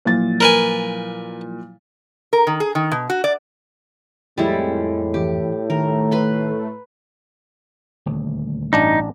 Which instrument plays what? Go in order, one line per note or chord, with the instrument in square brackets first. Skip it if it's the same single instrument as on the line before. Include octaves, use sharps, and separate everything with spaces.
[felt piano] A#2 A6 [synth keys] F3 F#3 E4
[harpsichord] A#4 B4 G#5
[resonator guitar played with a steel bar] A#4
D#3
G#4
D#3
B2
F#4
D5
[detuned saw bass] F2 [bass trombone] A2 [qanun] G3 G#3 E4
[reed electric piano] G#2 E3 [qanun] G4
[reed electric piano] D#3 [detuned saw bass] A3 [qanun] A#4
[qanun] B4 B5 C6
[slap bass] D#1 D2
[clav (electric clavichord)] A1 D4 A#5 [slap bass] G2 [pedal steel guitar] D#4